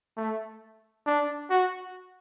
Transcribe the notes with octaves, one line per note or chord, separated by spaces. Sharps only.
A3
D4
F#4